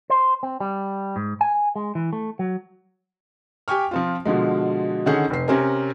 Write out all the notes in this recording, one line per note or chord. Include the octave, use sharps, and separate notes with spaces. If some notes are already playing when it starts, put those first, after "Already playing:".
C5
C4
G3
G#2
G#5
G#3
E3
A3
F#3
G4 G5 G#5 C#6 F6
F3 C4 F4
B2 D3 F3 G#3
D3 D#3 C#4 G#4 F#5 G6
F1 C7
C3 C4 C#4 A#4 G#5